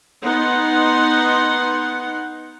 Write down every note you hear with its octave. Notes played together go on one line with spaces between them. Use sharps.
B3 D#4 F#5 C6